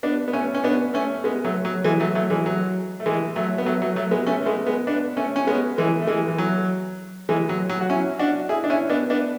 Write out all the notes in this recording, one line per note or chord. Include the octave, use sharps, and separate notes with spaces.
B3 D4
B3
A3 C#4
C#4
B3 D4
A3 C#4
G#3 B3
F#3 A3
F#3
E3 G#3
F#3 A3
F#3 A3
E3 G#3
F#3
A3
E3 G#3
F#3 A3
B3
F#3 A3
F#3 A3
F#3 A3
G#3 B3
A3 C#4
A3
G#3 B3
G#3 B3
B3 D4
A3 C#4
C#4
G#3 B3
E3 G#3
A3
E3 G#3
E3
F#3
E3 G#3
F#3
F#3
F#4
C#4 E4
D4 F#4
E4 G#4
D4
C#4 E4
B3 D4
B3 D4